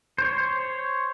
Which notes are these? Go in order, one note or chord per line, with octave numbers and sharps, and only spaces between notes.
C5 C#5